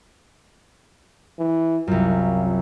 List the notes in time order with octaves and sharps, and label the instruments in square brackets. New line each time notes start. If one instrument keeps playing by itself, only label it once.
[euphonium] E3
[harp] C2 F#2 [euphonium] F4